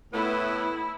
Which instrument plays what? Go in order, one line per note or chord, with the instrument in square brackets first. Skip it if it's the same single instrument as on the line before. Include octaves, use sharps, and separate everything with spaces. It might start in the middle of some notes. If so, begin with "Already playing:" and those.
[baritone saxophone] A2 [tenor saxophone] B3 [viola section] E4